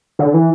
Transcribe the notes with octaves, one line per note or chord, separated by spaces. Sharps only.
D3
E3